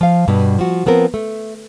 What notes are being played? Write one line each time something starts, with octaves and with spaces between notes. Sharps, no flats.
F3 F5
G2 B2
F3 F#4
F3 B3 C4 A#4
A3